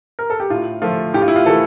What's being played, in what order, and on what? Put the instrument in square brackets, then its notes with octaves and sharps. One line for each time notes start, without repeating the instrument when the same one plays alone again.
[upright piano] A#4
A4
G4
A2 F4
F3 A3 F4
A2 G4
F4
E4
F4
E3 A3 A4